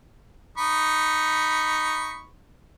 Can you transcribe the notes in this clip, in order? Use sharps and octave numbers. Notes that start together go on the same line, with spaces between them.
D#4 B5 C#6